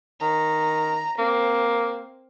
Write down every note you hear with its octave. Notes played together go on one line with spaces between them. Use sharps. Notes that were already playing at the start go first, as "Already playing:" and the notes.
D#3 A#5
A#3 C4